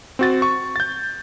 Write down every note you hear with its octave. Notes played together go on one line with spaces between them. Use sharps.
C4 F#4 A6
C#6
G6 A6